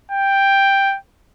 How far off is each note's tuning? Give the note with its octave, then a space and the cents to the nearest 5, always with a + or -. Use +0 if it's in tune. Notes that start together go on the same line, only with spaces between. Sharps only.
G5 +5